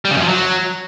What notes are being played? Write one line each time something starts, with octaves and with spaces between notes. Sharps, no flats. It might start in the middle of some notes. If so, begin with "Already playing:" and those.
G3
C#3
F#2
F3
F#3